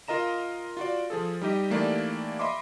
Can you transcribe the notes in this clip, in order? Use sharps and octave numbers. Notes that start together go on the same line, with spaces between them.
F4 A#4 D#5 A#5 E7
F4 F#4 D5
F3 G#4 A4
G3 D#4 G4 D#5
E3 A3 A#3 D#4 G4 D5
D#5 E5 B5 C6 D6